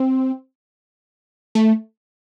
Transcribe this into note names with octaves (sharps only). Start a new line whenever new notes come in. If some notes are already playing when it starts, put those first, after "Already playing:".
Already playing: C4
A3